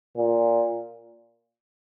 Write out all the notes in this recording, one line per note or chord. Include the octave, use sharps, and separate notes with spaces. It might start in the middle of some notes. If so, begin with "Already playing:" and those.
A#2